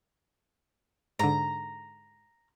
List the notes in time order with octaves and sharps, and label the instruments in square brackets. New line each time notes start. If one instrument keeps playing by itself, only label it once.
[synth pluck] G#2 D3 [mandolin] A#5